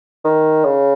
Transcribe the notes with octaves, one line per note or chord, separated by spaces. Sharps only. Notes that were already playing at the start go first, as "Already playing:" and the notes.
D#3
C#3